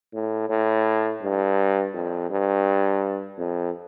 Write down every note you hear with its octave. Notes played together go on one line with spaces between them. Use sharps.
A2
A2
G2
F2
G2
F2